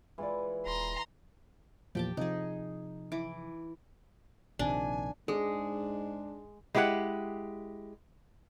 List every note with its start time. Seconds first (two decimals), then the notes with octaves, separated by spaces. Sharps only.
0.18 E3 G#3 F4 D5
0.66 D#1 A#5 C6
1.95 E2 A#2 F3 G4 G5 A5
2.17 C3 F3 D#4 G#4
3.12 E3 D6
4.59 A#1 C3 D#3 D4 G#5
5.28 G#2 G#3 D4 G#4
6.75 G#3 E4 G4 A4 F#5